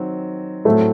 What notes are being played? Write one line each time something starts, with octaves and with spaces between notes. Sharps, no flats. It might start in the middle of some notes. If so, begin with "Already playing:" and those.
Already playing: D#3 F#3 C4
A2 F#3 A3 C4